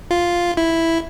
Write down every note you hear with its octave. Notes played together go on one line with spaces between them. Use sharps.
F4
E4